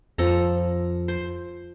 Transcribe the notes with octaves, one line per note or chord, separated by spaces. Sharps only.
F2 F3 A4 A#5
C5